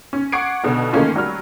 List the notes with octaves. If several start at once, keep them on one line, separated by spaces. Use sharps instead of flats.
C#4
F#5 C#6 D6 G#6 C7 D7
B1 B2 D3
D#3 E3 A3 A#3 C#4 F4
F#3 G3 F6